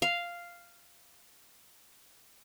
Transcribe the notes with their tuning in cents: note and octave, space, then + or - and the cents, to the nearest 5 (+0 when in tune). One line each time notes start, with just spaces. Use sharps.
F5 -5